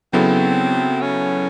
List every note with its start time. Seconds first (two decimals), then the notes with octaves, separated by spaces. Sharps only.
0.13 C#3 F#3 B3 C4 E4 A4
1.01 C#4